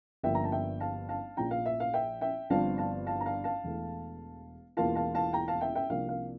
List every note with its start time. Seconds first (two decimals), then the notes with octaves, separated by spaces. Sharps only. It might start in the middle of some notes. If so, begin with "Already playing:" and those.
0.23 G1 G2 F3 A#3 E5 G5
0.35 A#5
0.44 A5
0.52 E5 G5
0.80 F5 A5
1.09 F5 A5
1.37 A#1 A#2 F3 G5 A#5
1.51 F5
1.66 E5
1.80 F5
1.94 E5 G5
2.21 E5 G5
2.50 G1 G2 F3 C4 F4 F5 A5
2.78 F5 A5
3.06 F5 A5
3.21 A#5
3.26 F5 A5
3.44 F5 A5
3.63 E1 E2 E3 A3
4.77 E1 E2 E3 A#3 F4 F5 A5
4.95 F5 A5
5.14 F5 A5
5.33 G5 A#5
5.48 F5 A5
5.61 E5 G5
5.75 E5 G5
5.90 C2 C3 F3 A#3 D4 F5
6.09 F5